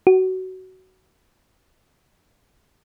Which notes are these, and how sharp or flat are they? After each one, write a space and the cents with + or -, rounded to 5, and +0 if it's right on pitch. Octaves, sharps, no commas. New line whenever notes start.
F#4 +20